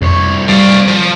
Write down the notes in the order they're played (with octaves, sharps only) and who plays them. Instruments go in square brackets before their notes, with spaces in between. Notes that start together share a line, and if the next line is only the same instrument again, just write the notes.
[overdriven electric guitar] C2 C#5 [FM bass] F2
[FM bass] G3 [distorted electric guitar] D5 F5
[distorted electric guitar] F3